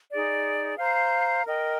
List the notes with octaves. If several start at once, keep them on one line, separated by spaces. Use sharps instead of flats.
D#4 G#4 D5
C5 F5 A#5
A#4 D#5 G5